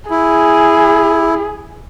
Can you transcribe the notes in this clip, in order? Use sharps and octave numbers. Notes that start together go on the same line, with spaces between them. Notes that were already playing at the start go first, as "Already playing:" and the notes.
E4 G#4